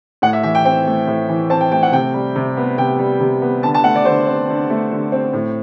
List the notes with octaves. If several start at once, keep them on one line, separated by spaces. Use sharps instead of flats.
A2 F#5
E5
E3 E5
G5
C4 G5
A3
A2
E3
C4 A5
G5
A3 G5
F#5
C3 G5
G3
C3
B3
C3 G5
G3
C3
B3
D3 A5
A5
A3 F#5
D5
D3 C5
C4
D3
A3
D3
C4
A2